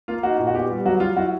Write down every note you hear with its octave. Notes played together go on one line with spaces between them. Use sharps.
A#3 F4
D#4 F#4
A#2
F#4
B3 G4
G3
F#3 F#4
F#3 F4
E4 F#4